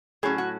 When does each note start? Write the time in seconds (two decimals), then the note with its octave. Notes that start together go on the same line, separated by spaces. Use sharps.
0.23 A2 F#3 C#4 G#4
0.38 F#4